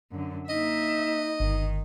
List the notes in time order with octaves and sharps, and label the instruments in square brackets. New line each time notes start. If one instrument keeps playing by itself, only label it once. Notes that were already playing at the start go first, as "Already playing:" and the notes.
[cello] F#2 D3
[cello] A#3 E5 [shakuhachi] D#4 [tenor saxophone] D#5
[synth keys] G1 [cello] D#3